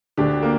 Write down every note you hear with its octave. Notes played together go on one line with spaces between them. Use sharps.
D2 D4 G4
A#3